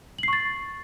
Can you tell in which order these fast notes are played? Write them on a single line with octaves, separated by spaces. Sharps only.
F#7 C7 C#6 A6